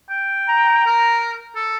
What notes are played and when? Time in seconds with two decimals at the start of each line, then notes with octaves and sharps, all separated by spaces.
0.10 G5
0.49 A#5
0.86 A#4
1.56 A4